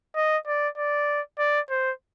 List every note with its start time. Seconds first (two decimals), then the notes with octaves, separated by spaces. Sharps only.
0.16 D#5
0.47 D5
0.77 D5
1.39 D5
1.70 C5